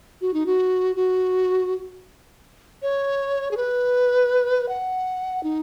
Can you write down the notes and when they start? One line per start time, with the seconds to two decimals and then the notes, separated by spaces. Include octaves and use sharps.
0.21 F#4
0.33 D#4
0.46 F#4
0.96 F#4
2.82 C#5
3.51 G#4
3.57 B4
4.68 F#5
5.43 D#4